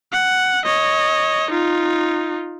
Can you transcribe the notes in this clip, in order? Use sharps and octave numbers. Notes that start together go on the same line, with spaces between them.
F#5
C#5 D#5
D#4 F4